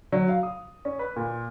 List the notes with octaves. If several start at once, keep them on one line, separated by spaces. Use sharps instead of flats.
F#3
F5
D#6
C#4
B4
A#2